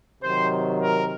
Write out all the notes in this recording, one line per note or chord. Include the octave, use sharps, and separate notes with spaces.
C3 D#3 F#3 C5
A#4